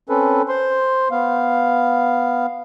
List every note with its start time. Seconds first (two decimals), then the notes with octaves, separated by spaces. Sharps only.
0.09 C4 C#4 A4 B4
0.49 C5 C6
1.11 B3 F5